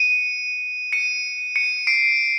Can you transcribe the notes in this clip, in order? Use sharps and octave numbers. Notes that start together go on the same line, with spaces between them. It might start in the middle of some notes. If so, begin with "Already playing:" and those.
Already playing: C#7 D#7
C#7 D#7
C#7 D#7
C7 D7